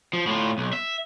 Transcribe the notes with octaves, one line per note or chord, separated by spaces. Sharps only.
F3
A2 F4
B1
E5